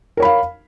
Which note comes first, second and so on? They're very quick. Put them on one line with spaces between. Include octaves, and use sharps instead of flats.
A#4 C#5 B5 F5